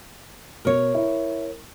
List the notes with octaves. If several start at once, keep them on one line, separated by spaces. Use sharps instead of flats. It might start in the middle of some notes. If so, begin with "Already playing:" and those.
B2 A#4 C#5
E4